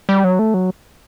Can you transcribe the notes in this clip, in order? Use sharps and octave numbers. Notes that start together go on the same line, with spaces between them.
G3
F#3
A3
F#3